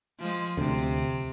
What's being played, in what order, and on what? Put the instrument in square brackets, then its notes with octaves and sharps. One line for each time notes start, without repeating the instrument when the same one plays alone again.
[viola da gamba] F3 G#3
[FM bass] D2 [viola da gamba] C3